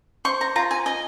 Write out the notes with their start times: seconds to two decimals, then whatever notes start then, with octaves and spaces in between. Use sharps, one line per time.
0.25 C5 C#6
0.41 A#5
0.56 F4 A#5
0.71 G#5
0.86 D#5 G#5